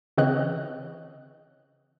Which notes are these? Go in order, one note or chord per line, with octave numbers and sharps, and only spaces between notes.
C#3 E3 C4 C#5 D#5 F#6